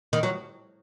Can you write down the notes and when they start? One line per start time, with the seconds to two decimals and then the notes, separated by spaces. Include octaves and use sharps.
0.13 D#3
0.23 F#3